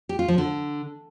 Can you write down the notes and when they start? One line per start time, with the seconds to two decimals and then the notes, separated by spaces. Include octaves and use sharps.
0.09 G4
0.19 F4
0.28 F3
0.38 D3